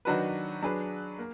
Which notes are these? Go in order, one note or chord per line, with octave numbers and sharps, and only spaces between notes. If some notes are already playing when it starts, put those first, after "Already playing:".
D#3 F#3 D4 F#4 B4
F#3 D4 G#4 B4
A#3